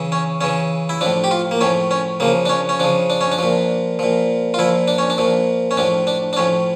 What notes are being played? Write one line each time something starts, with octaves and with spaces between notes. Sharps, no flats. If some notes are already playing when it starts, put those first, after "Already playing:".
Already playing: C#3 E3
C#4
C#3 E3 C#4
E4
A2 F3 D4
G4
F4
A#3
A2 F3 C#4
C#4
C#3 F3 A#3
D4
C#4
C#4
C#3 F3 D4
D4
C#4
D4
A#2 F3
A#2 F3
F4
A#2 F3 E4
D4
C#4
D4
A#2 F3
C#4
A2 F3 D4
D4
D4
A2 F3 C#4